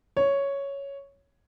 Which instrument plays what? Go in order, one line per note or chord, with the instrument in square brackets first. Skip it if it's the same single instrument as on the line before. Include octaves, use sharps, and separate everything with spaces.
[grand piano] C#5